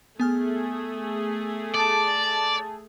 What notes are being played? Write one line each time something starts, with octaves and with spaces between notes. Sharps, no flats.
A3 B3 G#4 G#5 F6
D5 A5